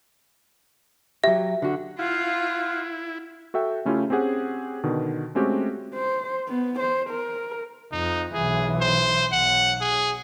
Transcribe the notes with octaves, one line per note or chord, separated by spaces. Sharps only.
F#3 G4 E5
D3 F#4
E4 F4 F5 F#5
F#4 A4 E5 G5
C#3 A3 C#4 E4 F4 G4
C4 C#4 G4 G#4 F#5
B2 D3 D#3
G#3 A3 C4 C#4 F#4 G4
C5
B3
C5
A#4
F2 D#4
B1 E3 G#4
C5
B1 F#5
G#4